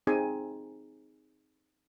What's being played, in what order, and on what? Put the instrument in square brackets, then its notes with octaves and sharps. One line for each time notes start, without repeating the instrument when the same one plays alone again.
[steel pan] C4 D#4 G#4 G#5